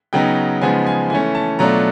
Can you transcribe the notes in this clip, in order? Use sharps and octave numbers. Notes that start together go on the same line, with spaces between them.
C#3 F#3 B3 D#4 G5
C#3 F3 G#3 B3 D#4 G#5
G#5
E3 A3 C#4 G#5
A5
B2 F#3 A3 D4 F4 A#5